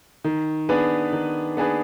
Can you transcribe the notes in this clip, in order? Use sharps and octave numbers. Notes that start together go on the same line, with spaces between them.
D#3
B3 D4 G#4 B4
D#3
B3 D4 G#4 B4